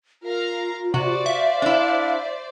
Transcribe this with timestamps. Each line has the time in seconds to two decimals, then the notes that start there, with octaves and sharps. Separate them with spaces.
0.23 F4 A#4 F5 A#5
0.94 C3 F#4 C5 D5
1.26 E5 F5
1.62 D4 E4